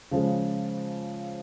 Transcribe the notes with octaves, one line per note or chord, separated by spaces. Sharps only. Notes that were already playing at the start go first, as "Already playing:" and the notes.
C#3 F3 G#3